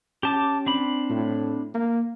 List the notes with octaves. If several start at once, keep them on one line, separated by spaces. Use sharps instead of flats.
C#4 G4 A5 D6
C4 D4 B5
A2
A#3